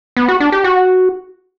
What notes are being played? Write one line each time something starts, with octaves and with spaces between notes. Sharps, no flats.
B3
F#4
D4
G4
F#4